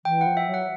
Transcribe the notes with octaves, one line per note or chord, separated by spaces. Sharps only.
E3 G5
F#5
F3
E5
F#3
F#5